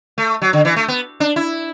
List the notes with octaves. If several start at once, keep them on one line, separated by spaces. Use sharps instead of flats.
A3
F#3
D3
E3
A3
B3
D4
E4